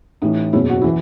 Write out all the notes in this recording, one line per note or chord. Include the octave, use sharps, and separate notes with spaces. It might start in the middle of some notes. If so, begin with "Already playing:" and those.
A1 A2 E3 D#4
F#1 E2 B2 F#3 C#4 E4
F#4
E3 E4